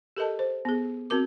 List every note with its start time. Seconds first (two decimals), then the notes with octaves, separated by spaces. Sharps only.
0.17 G4 A4 A#4 D#5 A5
0.39 C5
0.65 B3 G#4
1.10 C4 F#4 A#4 D6